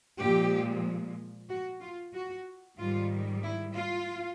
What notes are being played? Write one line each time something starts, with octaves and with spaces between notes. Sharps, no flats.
A#2 F3 G#3 G4
F#4
F4
F#4
G#2 D#3 G3 F4
E4
F4